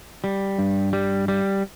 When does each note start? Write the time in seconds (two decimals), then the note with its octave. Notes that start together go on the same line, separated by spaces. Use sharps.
0.24 G3
0.59 G2
0.93 G3
1.28 G3